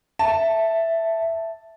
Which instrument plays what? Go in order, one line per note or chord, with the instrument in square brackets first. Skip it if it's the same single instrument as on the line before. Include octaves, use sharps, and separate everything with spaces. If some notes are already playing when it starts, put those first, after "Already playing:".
[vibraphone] E5 [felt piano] A5